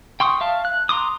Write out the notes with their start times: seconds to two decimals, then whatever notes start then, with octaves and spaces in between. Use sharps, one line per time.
0.20 G5 C6 C#6 D#6
0.41 E5 F5 A5
0.65 F#6
0.89 A#5 C6 D6 D#6